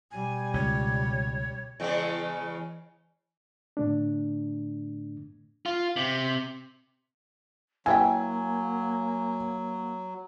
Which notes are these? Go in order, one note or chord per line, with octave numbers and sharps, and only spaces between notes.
B2 G3 G#5
C#2 C#5
E2 C#3 G#3
A2 D3 A3 D4
F4
C3
F#3 A#3 E4 E5 G5 G#5